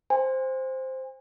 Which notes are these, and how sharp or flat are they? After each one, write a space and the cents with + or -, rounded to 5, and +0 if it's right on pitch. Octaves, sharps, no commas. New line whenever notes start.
C5 +0 G#5 -35